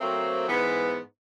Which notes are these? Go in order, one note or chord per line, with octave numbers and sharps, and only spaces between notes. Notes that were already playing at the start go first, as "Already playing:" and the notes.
F#3 A3 A#3 C4
G#2 E3 B3